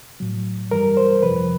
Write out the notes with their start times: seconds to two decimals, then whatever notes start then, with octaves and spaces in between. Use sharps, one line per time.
0.20 A2 F#3
0.71 G2 E3 G3 A#4
0.97 C5
1.23 F2 C3 F3 B4